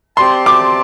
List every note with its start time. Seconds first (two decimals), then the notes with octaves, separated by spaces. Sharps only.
0.17 C4 G4 D5 A5 C6
0.46 D6